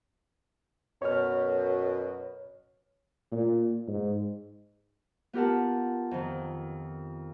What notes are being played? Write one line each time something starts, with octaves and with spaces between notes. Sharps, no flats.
F#2 B2 C#5 F6
A#2
G#2
B3 F4 G4 A#4 F#5 A5
F2 D#3